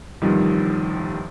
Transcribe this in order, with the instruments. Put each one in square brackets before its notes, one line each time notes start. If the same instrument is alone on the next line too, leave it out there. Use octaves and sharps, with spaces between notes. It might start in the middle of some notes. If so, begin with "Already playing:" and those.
[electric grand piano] A1 G2 C3 D#3 F3 G3